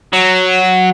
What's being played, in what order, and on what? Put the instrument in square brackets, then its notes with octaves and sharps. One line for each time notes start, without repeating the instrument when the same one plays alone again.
[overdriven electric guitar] F#3